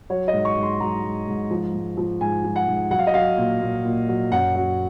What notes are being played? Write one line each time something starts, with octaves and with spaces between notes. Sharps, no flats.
F#3 C#5
D#5
G#2
C#6
G#2
C6
F#3 A#5
G#2
G#2
F3
G#2
F3
G#2 G#5
F3
F#5
G#2
F#3 F#5
F5
D#5
F#3 F5
A#2
A#2
A#2
F#3
F#2 F#5
F#3